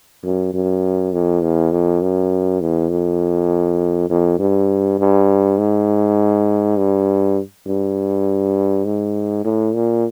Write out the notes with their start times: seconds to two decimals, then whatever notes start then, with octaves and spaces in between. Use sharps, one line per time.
0.24 F#2
0.54 F#2
1.13 F2
1.42 E2
1.72 F2
2.02 F#2
2.61 E2
2.91 F2
4.10 F2
4.39 G2
4.99 G2
5.58 G#2
6.77 G2
7.67 G2
8.85 G#2
9.45 A2
9.74 A#2